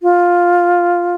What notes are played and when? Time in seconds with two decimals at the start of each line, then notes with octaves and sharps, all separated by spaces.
0.02 F4